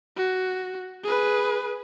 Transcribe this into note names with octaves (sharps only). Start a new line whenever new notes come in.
F#4
G#4 B4